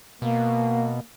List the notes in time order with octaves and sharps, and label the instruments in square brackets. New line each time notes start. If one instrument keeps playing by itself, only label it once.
[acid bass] B2 [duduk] A#3